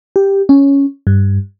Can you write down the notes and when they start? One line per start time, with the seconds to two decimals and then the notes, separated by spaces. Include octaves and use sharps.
0.16 G4
0.49 C#4
1.07 G2